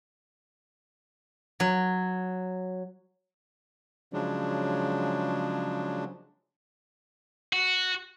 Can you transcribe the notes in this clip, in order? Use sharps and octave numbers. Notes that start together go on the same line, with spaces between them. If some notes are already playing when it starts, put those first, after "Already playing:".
F#3
C#3 F3 F#3 G#3 D4
F#4